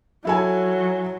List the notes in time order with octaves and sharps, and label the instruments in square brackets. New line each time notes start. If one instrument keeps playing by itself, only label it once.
[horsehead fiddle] F#3 [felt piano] E4 A4 G#5